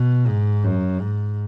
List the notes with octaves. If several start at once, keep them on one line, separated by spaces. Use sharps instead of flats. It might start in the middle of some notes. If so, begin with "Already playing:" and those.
Already playing: B2
G#2
F#2
G#2